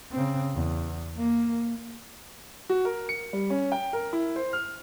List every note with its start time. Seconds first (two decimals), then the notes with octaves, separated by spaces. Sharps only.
0.12 C#3 C4
0.54 E2
1.18 A#3
2.70 F#4
2.85 A#4
3.09 C#7
3.33 G3
3.50 C#4
3.72 G5
3.93 A#4
4.13 E4
4.36 C5
4.53 F6